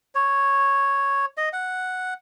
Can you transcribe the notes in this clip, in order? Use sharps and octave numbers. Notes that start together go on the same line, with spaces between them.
C#5
D#5
F#5